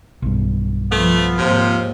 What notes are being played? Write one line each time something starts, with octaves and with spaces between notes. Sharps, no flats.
B1 G2
F3 A3 B3 F4
D#2 G#2 C3 F3